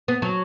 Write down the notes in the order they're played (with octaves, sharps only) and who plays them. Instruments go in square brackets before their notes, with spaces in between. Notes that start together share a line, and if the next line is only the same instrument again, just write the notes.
[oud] B3
F#3